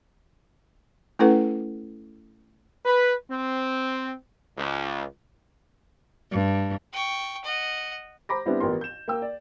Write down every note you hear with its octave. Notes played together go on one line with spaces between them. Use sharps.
A3 C#4 E4 A4 B4 F#5
B4
C4
C#2
G2
G5 C#6
D#5 F#5
C5 A#5 B5 D6 A#6
G3 B3 C4 D4 E4
A1 F3 B3 A#4 C6
G6 E7
A#3 G5 E6
D5